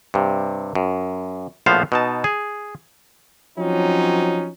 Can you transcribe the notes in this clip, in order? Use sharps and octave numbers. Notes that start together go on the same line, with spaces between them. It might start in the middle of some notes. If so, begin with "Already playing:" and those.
G2 C3
F#2
A#1 A2 F3 B3 C5 F5
B2 D#4 A5
G#4
F3 F#3 C4 C#4 D#4